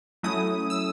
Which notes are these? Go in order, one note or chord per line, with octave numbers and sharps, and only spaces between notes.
F#3 A3 C#4 E4 D#6
E6